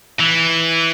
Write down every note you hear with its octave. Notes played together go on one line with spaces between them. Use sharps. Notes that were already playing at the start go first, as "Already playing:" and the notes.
E3